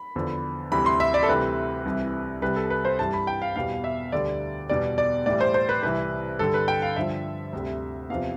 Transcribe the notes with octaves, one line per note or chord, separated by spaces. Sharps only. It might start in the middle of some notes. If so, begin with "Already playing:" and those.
Already playing: B5
E2 D3 F3
D2 C3 E3 G3 B5
C6
E5
D5
A4
D2 C3 E3 G3 B4
C2 C3 E3
C2 C3 G3 B4
A4
B4
C5
G2 E3 G3 A5
B5
G5
F5
E2 B2 G3 F5
E5
D2 D3 G3 D5
E2 B2 G3 D5
D5
A2 E3 G3 D5
C5
C5
B4
C2 C3 E3 B4
G2 D3 G3 A4
B4
G5
F5
G2 D3 F3 E5
D2 C3 G3
E2 C3 F3 F5